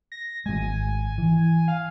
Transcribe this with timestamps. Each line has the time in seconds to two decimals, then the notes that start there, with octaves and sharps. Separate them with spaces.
0.12 A#6
0.46 G#1 G#3 G#5
1.18 E3
1.68 F5